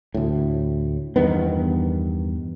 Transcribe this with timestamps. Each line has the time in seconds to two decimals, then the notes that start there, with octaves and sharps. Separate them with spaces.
0.14 D2 A2
1.16 E2 G2 D#3 B3